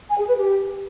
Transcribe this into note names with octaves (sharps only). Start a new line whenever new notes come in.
G#5
G#4
B4
G4